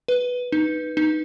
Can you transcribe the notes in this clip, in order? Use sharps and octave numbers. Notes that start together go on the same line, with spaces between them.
B4
D#4
D#4